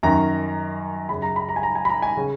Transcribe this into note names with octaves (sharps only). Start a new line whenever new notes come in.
F#2 D#3 A#5
F#2 C#3 B5
A#5
B5
A#5
G#5
A#5
G#5
B5
A#5
G#5
C#3